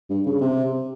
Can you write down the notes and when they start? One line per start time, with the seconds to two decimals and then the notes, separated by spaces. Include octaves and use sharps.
0.10 G2
0.26 C#3
0.41 C3